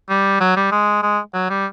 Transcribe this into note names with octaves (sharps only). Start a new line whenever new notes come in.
G3
F#3
G3
G#3
G#3
F#3
G3